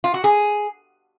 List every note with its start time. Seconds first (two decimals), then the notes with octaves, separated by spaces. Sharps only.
0.04 F4
0.14 F#4
0.24 G#4